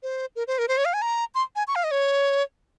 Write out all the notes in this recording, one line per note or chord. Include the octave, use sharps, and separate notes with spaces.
C5
A#4
C5
A#4
C5
C#5
F5
G#5
A#5
C6
G#5
C#6
F5
D#5
C#5